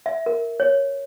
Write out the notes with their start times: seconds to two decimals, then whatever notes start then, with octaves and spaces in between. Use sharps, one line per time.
0.06 E5
0.26 A#4
0.60 C#5